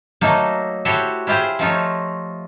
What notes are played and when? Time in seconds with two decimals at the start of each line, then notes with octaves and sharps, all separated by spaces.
0.21 F#3 A3 A#3 D#4 A4
0.85 E4 F#4 G4 A4 C5 C#5
1.27 E4 F4 G4 G#4 C5
1.59 F3 A3 D#4 F4 C#5